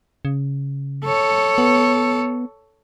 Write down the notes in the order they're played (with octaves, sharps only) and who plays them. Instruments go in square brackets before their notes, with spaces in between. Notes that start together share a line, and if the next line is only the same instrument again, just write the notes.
[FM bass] C#3
[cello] A4 C#5
[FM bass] B3